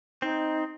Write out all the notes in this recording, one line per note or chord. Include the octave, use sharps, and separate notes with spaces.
C4 D#4